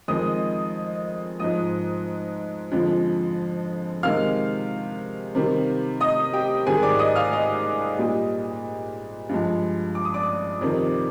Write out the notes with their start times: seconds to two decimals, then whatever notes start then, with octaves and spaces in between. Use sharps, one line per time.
0.08 F2 D#3 G#3 D#5 D#6
1.40 G#2 F3 G#3 D#5 D#6
2.72 F2 D3 F3 G#3
4.03 C3 D#3 G#3 F5 F6
5.35 C3 D#3 G3
6.00 D#5 D#6
6.33 G4 G5
6.66 G#2 D#3 G3 G#4 G#5
6.83 D5 D6
6.99 D#5 D#6
7.16 F5 F6
7.33 D#5 D#6
7.98 A#2 G3
9.29 G2 F3 G#3
9.95 D6
10.05 D#6
10.14 D5 D6
10.61 F2 C3 D#3